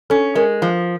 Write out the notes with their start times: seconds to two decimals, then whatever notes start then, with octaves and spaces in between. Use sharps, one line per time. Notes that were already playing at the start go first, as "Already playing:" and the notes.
0.10 C#4 A4
0.35 G#3 A#4
0.62 F3